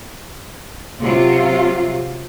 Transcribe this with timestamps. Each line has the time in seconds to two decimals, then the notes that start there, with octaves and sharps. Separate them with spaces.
0.99 C3 F#3 F4